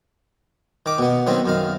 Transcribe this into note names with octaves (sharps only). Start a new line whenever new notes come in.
D#3 D6
B2 B3
D#3 F#3 B3 C4
F#2 D#3 F5